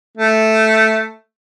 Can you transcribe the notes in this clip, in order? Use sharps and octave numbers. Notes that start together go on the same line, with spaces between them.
A3